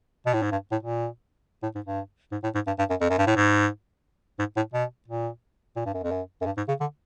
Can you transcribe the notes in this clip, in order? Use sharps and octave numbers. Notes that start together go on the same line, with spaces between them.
B2
A2
G#2
G2
A2
A#2
A2
G#2
G2
G#2
A2
G#2
G2
G2
F#2
F2
F#2
G2
A2
G#2
G#2
A2
B2
A#2
A#2
G2
F#2
F2
F#2
F#2
G2
G#2
C#3
D3